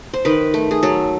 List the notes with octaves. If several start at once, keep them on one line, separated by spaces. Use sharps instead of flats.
C5
D#3 B4
A3
G#4
F#3 A4